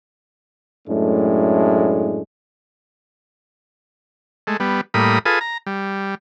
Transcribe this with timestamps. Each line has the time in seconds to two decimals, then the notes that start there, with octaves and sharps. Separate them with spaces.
0.87 F#2 A2 G#3 A3 D4
4.47 G#3 A3
4.60 G3 B3
4.94 A2 G3 A#3 B5 D#6
5.25 F4 G#4 A4 B4 D#6
5.41 A#5
5.67 G3